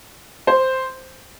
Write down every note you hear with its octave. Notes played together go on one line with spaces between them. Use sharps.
C5